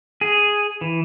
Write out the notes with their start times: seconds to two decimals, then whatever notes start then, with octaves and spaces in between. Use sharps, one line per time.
0.21 G#4
0.81 E3